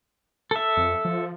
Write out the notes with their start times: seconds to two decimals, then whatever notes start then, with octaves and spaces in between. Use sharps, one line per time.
0.51 A4 E5
0.77 F2
1.05 F3